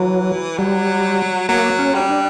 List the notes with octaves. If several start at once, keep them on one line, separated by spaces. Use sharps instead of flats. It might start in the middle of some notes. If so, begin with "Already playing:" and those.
Already playing: E3 F#3
F#3 G3
F#3 A#3
C#4
G3
D4